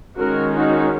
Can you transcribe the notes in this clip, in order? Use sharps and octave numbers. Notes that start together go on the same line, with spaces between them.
D#3 G#3 C#4 F#4 A#4
D#4 F#4